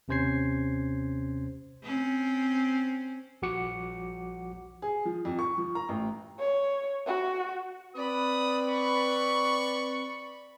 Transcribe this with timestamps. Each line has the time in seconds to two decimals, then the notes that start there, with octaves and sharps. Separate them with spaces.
0.08 D#2 C3 C#4 C5 G#6 C7
1.83 C4 C#4
3.42 A#1 F3 F#4 F#5 D6 C#7
4.82 G#4
5.05 F3
5.25 F2
5.39 C#6
5.58 F3
5.75 A#5
5.89 A1
6.39 C#5
7.07 F#4
7.96 C4 B4 D5 B5 D#6
8.69 C#6